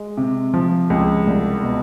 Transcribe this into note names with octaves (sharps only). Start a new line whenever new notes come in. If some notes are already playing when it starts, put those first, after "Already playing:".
Already playing: G#3
C3
F3
C#2
C2
B2